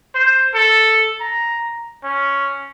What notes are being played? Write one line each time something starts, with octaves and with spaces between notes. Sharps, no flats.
C5
A4
A#5
C#4